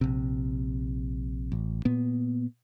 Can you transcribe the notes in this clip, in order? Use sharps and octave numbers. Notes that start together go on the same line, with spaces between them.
A#1 C3
A1
A#2 B3